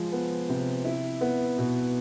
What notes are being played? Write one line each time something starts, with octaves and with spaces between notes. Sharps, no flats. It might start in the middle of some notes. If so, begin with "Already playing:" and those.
Already playing: F3 G#3
B3
C3
E4
B3
B2